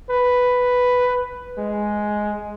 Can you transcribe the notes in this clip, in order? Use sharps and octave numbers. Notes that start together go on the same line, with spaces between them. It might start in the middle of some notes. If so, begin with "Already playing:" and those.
B4
G#3